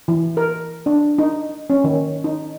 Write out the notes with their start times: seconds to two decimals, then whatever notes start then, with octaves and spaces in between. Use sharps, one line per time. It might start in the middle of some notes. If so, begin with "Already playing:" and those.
0.08 E3
0.37 A#4
0.86 D4
1.19 D#4
1.70 C#4
1.84 D#3
2.24 D#4